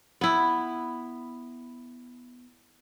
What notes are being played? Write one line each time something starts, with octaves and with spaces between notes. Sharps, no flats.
B3 E4